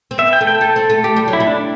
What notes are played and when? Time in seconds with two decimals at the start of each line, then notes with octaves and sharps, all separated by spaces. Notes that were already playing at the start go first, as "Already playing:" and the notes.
0.11 C4
0.18 B3 E5
0.33 G5
0.41 A3
0.47 G5
0.61 A3 A4
0.76 C4
0.90 A3
1.04 A3 G4
1.16 G3
1.28 F#3
1.33 E4
1.40 G3
1.47 D4